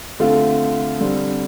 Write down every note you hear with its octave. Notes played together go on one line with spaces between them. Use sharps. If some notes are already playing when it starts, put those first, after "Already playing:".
D3 A3 C4 F4
D3 G3 C4